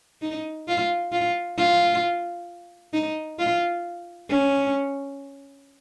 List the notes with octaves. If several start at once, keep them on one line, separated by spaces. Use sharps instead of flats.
D#4
F4
F4
F4
D#4
F4
C#4